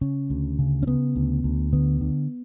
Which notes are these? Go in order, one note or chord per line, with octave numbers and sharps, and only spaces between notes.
C#3 C#4
D2
C#3
C#4
C#3 B3
D2
D2
D3 B3
D3